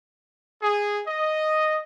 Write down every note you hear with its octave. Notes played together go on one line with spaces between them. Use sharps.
G#4
D#5